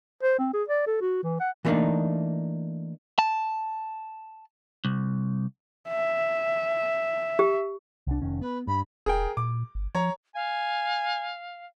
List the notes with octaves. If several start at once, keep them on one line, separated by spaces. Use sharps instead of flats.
C5
C4
G#4
D5
A4
F#4
E3
F#5
E3 G3 A3 A#3 D4 D#4
A5
C2
E5
G4
C2 D4
F1 D#3 C#4
B3 B4
G2 B5
E1 G#4 A#4 G5
A#2 D6
G1
F3 C#5 A#5
F5 G#5